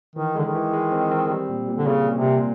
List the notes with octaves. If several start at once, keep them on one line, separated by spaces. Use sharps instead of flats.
D#3 E3
D3 G#3
D#3
E3
G#3
C4
C4
G3
A#2
A#2
D3
A#2 C#3
A#2
C3
A#2